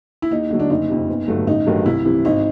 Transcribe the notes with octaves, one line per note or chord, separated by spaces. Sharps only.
E4
D#2 D#4
D3 F#3 A3
D4
F#1 D#4
F2 C3
G1
G2 D3 F#3 A3
A1 D#4
G2 D#3 F#3 A3
C2 E4
C3 E3
G#1 D#4